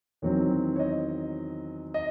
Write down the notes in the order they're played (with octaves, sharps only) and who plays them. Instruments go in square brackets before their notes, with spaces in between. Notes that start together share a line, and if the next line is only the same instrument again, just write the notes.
[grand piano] E2 D#3 F#3 C4 C#5
C#5
D#5
D#5